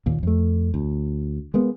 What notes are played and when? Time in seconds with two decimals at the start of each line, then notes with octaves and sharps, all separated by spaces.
0.06 D#2 A#2
0.23 F2 A3
0.74 D2
1.54 G#3 A#3 B3